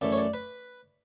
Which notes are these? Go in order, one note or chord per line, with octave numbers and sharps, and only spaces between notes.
F#2 E3 A3 D5
C#5
D5
B4